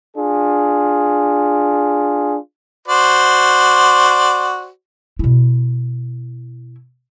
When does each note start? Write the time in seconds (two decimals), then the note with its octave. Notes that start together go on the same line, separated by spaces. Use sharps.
0.16 D4 F4 G#4
2.88 F#4 C5 D5
5.19 B2 E4